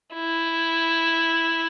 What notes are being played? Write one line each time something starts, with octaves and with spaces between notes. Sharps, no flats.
E4